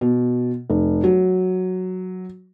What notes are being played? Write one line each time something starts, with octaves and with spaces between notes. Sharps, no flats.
B2
F1
F#3